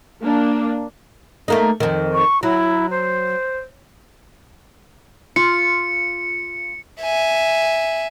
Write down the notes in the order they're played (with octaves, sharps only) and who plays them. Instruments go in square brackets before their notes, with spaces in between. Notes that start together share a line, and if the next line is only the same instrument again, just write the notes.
[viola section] A#3 D4
[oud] A3 A#3 D#4
F2 D#3
[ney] C#6
[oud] F#3 [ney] E4
[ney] C5
[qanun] F4 [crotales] C#7
[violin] E5 G#5